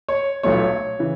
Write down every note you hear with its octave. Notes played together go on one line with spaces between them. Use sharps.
C#5
B1 A#2 F#3 A3 C#5
C#3 E3